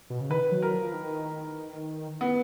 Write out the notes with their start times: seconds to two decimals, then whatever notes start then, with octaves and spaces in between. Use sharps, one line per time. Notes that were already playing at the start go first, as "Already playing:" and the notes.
0.10 B2
0.20 C#3
0.30 D#3 B4
0.52 F#3
0.62 A#4
0.73 F3
0.93 D#3
2.21 B3